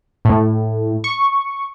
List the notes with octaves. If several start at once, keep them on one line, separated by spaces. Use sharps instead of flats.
A2
C#6